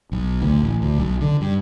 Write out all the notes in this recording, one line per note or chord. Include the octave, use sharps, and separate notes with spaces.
B1
D2
A1
D2
B1
D3
G2